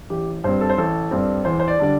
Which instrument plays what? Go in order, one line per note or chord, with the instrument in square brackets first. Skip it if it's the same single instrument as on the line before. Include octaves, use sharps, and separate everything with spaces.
[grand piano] A1 G4
G2 G3 C4 C5
A4
C5
A1 A4
G2 G3 C4
E2 C5
C5
D5
D3 G3 D4 D5